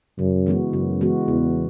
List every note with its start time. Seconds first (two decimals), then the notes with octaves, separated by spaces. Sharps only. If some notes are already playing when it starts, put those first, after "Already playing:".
0.19 F#2 C#3
0.47 E3 G#3 B3 F#4
0.73 F#2 C#3
1.01 E3 G#3 B3 F#4
1.28 E2 C#3